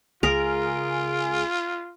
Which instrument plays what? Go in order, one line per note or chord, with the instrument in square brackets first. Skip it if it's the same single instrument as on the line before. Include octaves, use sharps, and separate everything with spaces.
[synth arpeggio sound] C#2 G#4 D7 [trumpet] F4 [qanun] A#4